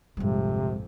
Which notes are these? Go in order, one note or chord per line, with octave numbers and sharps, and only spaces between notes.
A#1 F2 G#2 C3 G3